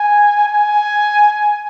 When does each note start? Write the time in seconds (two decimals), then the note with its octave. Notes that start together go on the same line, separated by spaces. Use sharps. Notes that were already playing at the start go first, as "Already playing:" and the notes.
Already playing: G#5
0.48 G#5